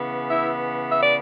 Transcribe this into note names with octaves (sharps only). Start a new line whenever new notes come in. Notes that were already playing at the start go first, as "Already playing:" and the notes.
Already playing: C#3 E3 B3
E4 E5
E5
D5